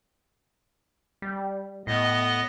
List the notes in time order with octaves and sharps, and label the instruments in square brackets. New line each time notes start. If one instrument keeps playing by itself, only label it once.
[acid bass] G3
[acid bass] A2 [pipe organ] B3 D#5